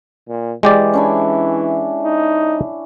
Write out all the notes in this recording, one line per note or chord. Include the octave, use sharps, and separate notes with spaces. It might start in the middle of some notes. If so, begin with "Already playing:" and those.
A#2
E3 G#3 G4 D5
C#4 D4 E4
D#4